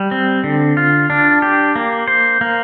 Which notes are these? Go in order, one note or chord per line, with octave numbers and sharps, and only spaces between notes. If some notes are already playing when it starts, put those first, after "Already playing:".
Already playing: G3
C4
D3
F4
D4
G4
A#3
C5
A#3